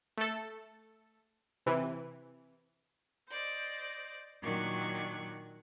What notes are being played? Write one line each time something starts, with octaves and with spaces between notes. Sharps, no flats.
A3 A4
C3 E3
C5 D5 D#5
A#2 D#3 F#3 D4 C#6 F#6